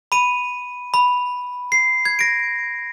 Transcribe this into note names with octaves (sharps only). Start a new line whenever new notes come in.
B5 D#7
B5
C7
G#6
A#6 D7